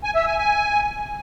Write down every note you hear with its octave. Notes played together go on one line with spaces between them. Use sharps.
G#5
E5
G#5
G#5